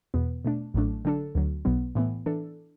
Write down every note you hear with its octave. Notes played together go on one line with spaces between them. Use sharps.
E2 B2 B3
B2 A3 D4
A1 A2 F#3 A3 D4
D3 F#3 D4 A4
D2 D3 F#3
B1 B2 F#3 B3
A2 E3 B3
E3 D4 A4